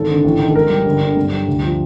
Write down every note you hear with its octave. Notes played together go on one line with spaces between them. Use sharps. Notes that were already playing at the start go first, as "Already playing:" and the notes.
Already playing: G#1 A4
D3
A1
D#3
A4
G#2 A#4
G3
G1
D3
G2
G3
D2
F3